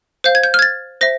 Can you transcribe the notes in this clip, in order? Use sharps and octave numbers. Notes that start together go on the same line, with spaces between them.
C5 F5 G6
G#6
G6
F6 G#6
A6
C5 E5 A#6